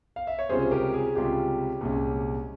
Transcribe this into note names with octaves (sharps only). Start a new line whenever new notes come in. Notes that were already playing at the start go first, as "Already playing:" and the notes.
F5
E5
C#5
C#2 C3 G3 C#4 F4 G#4 C5
G4 A#4
G#4
C#2 C3 G3 C#4 F4 G4
C2 A#2 G#3 C#4